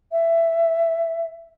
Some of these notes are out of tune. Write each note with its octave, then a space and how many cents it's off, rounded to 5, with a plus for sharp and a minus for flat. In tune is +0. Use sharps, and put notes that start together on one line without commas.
E5 +10